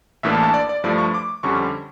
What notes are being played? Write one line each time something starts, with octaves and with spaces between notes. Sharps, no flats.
A1 A2 E3 A#3 D4 E5
A5
A5
D5
D5
G2 F3 A3 E4 D5
C#6
D6
F2 D3 G3 C#4 C#6